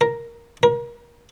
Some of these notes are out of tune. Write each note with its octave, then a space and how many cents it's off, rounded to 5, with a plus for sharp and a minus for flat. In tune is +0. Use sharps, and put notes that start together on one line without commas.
A#4 +5
A#4 +30